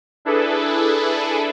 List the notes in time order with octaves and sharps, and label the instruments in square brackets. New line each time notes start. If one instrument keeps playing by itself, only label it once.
[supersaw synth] D4 E4 G#4 A4 B4